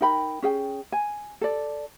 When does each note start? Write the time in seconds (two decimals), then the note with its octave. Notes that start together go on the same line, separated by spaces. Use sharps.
0.01 D#4 A#4 G5 B5
0.42 C#4 G#4 G5
0.92 G#5
1.41 A4 D5